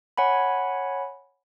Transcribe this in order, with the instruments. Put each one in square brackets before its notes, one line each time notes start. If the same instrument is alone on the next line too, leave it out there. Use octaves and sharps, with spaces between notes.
[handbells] C#5 F#5 G#5 B5